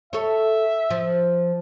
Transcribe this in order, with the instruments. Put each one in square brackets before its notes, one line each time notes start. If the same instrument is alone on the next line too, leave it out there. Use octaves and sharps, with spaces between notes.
[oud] A4 C#5 [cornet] E5
[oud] F3